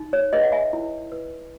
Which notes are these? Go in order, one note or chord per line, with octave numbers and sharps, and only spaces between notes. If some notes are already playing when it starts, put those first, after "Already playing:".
Already playing: D#4
C#5
G#4 B4 D#5
F#5
E5 G#5
E4
B4